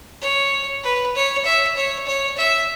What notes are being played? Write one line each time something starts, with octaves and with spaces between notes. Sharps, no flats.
C#5
B4
C#5
E5
C#5
C#5
E5